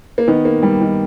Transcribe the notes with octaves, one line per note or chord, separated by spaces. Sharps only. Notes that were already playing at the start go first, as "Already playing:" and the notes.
A#3
D#3 B3
A#3
G3
D#3